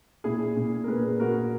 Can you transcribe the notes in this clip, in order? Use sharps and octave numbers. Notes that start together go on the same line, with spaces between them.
A#2 E4 G#4
A#2
A#4
A#2 G#4 B4
A#2 F#4 A#4